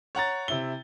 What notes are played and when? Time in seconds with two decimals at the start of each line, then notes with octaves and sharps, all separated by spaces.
0.15 C#5 F#5 A#5 A6
0.48 C3 E4 G7